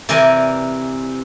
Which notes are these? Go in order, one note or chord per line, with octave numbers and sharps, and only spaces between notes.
C3 E3 A#4 D5 G#5